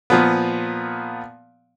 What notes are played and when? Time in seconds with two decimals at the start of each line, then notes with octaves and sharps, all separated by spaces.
0.10 A#2 F3 B3